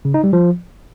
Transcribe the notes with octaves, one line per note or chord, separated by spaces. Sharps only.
C#3
D#4
G3
F3